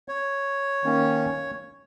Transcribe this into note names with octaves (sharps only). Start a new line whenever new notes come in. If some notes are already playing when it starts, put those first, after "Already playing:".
C#5
D#3 A#3 C#4